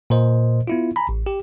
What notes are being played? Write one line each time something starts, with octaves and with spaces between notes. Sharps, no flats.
A#2 A#4 C5 D#5
B3 E4 F4
G#5 A#5 B5
A1
G4